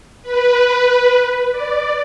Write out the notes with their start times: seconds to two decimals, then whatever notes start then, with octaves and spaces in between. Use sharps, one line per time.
0.23 B4
1.51 D5